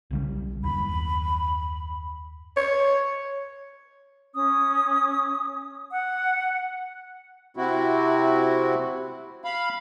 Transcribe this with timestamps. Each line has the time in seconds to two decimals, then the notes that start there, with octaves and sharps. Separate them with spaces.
0.11 B1 C#3 G3
0.64 F#1 D#2 B5
2.57 C#5
4.34 C#4 D#6
5.90 F#5
7.57 C3 C4 E4 F#4
9.44 F5 B5